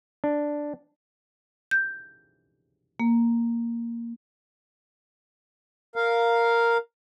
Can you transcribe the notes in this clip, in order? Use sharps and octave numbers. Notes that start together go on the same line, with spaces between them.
D4
G6
A#3
A#4 F5